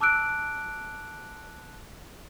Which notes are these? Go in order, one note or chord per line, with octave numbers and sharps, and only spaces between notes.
A5 D6 E6 F#6 D7